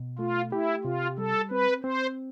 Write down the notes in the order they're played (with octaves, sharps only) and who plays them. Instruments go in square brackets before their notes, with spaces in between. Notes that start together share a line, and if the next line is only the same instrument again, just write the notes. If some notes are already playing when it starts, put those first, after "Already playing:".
Already playing: [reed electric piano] B2
[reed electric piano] A3 [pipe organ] F4
[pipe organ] E4 [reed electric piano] G4
[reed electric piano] C3 [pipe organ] F4
[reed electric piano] G3 [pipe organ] A4
[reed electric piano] C4 [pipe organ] B4
[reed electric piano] C4 [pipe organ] C5